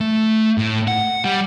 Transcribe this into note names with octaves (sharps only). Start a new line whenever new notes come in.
A3
A2
F#5
G3